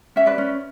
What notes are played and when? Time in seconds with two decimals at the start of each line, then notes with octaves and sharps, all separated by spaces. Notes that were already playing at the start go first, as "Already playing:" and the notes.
0.16 C#4 E5
0.26 B4 D5
0.38 C#4